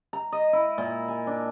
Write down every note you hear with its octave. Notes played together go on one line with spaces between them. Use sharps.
A#5
D#5
E4
A#2
G#5
D4